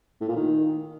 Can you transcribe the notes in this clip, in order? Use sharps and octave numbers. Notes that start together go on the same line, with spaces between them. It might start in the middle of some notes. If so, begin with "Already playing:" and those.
A2
A#2
D#3